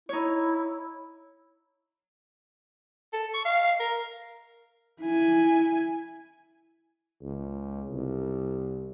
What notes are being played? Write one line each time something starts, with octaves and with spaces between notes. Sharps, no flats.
D#4 E4 C#5
A4
C#6
F5
A#4
E4 G#5
C#2
C2